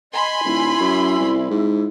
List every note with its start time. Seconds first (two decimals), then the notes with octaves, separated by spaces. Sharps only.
0.13 D#5 G#5 B5 C6
0.45 D#1 E4
0.80 F#2
1.20 C2
1.51 G#2